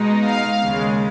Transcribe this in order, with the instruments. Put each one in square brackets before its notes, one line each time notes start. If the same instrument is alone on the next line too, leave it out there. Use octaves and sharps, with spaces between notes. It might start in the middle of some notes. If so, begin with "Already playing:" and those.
Already playing: [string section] B2 G#3 D#4
F5
D#2 C#3 G#3